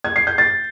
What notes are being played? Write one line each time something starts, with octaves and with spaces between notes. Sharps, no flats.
G#6
C7
G6
A6